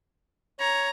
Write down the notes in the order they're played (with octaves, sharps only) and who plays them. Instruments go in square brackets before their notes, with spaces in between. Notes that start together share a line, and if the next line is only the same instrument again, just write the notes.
[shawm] C#5 [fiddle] A#5